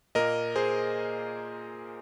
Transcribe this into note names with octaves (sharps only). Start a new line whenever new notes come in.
A#2 A#3 A#4 D#5
G#4 C5